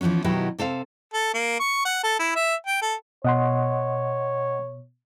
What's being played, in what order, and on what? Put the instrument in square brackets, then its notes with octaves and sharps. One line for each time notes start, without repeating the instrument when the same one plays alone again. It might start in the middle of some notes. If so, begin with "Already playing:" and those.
[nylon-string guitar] E3 F3 G3 B3 C#4
B2 D#3 F#3 B3 E4 G4
C3 A4 C5 F5
[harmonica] A4
A#3
C#6
F#5
A4
E4
E5
G5
A4
[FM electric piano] B2 [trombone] C#5 [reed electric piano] D#5 F#5 C6